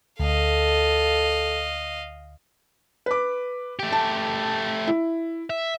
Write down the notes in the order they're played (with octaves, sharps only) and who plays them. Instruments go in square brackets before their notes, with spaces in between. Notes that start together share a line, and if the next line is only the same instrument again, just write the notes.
[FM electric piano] D2 [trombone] A4 [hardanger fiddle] D#5 F5
[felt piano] B4 D6
[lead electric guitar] A3 G4
[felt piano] A5
E4
[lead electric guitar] E5